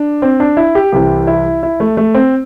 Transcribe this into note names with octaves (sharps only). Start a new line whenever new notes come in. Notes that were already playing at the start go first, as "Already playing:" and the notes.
Already playing: D4
C4
D4
E4
G4
C2 C3 E3 G4
E4
E4
A3
A3
C4